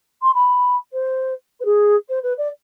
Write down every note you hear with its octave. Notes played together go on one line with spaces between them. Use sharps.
C6
B5
C5
B4
G#4
C5
B4
D5